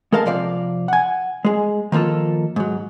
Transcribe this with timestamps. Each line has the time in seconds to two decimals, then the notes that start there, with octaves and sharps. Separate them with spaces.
0.12 G#3 A4 A#4 F5 A5
0.26 C3 F3 D5 F5
0.88 F#5 G#5
1.45 G#3 G#4
1.92 D#3 F3 A#3 F4 A4
2.56 G#2 F#3